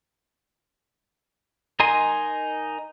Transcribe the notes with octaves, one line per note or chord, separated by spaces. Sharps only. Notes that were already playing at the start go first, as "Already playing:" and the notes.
D#4 A#4 D#5 G#5 C6